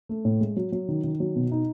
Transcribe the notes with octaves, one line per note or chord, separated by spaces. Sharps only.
A3
A2
G#3
F#3
F#3
D#3
D#3
F#3
B2
D#4